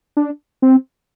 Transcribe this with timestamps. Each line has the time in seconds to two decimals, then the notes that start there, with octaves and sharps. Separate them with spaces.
0.17 D4
0.62 C4